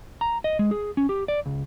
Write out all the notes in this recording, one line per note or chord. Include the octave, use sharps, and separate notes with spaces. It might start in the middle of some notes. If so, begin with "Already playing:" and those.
A#5
D#5
G#3
G#4
C#4
G4
D5
C#2